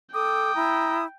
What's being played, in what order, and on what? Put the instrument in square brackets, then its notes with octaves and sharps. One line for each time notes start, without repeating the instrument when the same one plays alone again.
[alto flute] A4 [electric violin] G5 [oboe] D6 [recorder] D#6
[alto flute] E4 [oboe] A#5